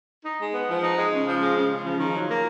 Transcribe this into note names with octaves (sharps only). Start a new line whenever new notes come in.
D#4
G#3
B3
F3
D#4
G#3
C#3
F3
G#3
C#3
C#3
F3
D#3
F#3
A#3